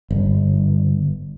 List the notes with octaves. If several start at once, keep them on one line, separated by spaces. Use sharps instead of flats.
G1